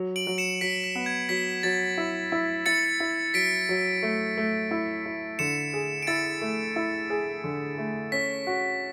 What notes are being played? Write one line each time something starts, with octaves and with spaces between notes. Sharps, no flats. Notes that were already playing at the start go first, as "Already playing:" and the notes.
Already playing: F#3
D7 F#7
F#3
C#7 E7
F#3 B6 D7
B6
B3
G#6
F#3 B6
F#3 A6
E4
E4
E4 A6 C#7
E4
F#3 B6 D7
F#3
A3
A3
E4
E4
D3 C#7 E7
G#4
D7
E4 A6 C#7
A3
E4
G#4
D3
A3
C#4 B6
F#4